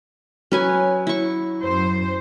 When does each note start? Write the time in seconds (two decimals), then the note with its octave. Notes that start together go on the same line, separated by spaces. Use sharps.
0.52 F#3 C#4 B4 G#5
1.07 E4 C#6
1.62 F#2 C5